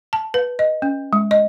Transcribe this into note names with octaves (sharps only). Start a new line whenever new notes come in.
A5
B4
D#5
C#4
G#3
D#5